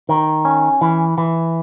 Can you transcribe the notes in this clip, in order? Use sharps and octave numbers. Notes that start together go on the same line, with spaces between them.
D#3
C#4
E3
E3